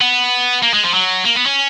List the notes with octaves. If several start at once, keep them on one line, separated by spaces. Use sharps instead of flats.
B3
A#3
G#3
F3
F#3
A#3
B3
C#4